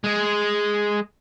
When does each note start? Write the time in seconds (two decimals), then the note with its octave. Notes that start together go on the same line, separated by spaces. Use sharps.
0.04 G#3 G#4